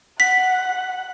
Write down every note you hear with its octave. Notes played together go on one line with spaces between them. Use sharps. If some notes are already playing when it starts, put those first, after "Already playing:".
F#5 B6